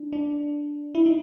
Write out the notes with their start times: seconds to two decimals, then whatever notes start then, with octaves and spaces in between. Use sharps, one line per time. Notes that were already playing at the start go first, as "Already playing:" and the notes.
Already playing: D4
0.12 D4
0.95 E4
1.06 D#4